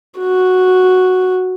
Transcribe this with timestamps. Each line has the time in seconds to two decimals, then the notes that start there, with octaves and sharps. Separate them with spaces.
0.19 F#4